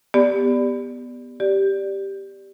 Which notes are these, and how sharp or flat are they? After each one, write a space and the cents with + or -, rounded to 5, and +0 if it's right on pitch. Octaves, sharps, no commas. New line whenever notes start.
B3 +0 G4 +15 D5 +0
G4 +0 D5 +0